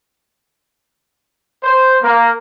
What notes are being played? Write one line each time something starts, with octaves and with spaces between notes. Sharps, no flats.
C5
A#3